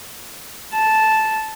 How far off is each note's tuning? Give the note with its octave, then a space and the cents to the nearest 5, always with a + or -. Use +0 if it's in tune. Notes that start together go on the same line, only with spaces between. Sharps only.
A5 -5